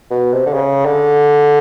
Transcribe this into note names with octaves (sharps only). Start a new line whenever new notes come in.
B2
C3
D3
C#3
D3